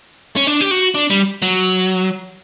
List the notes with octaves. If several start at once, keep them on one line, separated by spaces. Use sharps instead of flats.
C#4
D4
G4
F#4
D4
G3
F#3